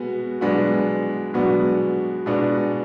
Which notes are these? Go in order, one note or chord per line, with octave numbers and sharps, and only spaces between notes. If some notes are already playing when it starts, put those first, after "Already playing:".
Already playing: B2 G#3 B3 F#4
B2 G#3 B3 D4 F#4
B2 G#3 B3 D4 F#4
B2 G#3 B3 D4 F#4